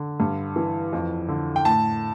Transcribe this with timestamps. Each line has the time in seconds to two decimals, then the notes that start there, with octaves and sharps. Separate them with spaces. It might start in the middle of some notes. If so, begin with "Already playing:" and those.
Already playing: D3
0.20 G2
0.56 E3
0.93 F2
1.28 D3
1.56 G5
1.65 A2 A5